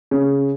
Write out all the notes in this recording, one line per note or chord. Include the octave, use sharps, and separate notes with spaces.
C#3